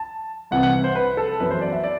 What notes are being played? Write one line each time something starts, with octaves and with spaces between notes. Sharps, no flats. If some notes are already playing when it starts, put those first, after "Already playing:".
Already playing: A5
C2 C3 E3 F#5
F#5
C5
B4
A4
F#2 E3 B3 B4
C5
D5
E5
D5